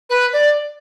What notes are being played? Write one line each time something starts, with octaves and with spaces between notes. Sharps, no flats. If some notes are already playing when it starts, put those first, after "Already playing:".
B4
D5